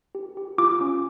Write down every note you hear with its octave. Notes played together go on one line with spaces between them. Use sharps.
G4
G4
F4 D6
C#4